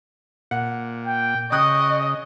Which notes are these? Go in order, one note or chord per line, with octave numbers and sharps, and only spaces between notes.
A#2 F#5
G5
C#3 D#5 G5 C#6 D#6 F#6